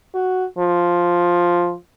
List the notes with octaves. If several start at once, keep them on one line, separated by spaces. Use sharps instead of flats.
F#4
F3